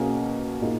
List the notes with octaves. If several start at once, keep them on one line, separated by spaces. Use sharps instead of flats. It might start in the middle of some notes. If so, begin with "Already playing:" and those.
Already playing: B2 A#3 C#4 G#4
A#2 A#3 D#4 G#4